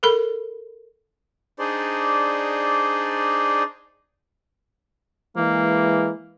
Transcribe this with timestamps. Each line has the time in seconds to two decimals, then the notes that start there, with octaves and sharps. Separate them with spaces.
0.03 A4 A#4 B5
1.58 D4 D#4 G#4 C5 D5
5.37 E3 G#3 A#3